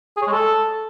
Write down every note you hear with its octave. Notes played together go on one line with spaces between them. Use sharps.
G#4
C#5
G#3
A4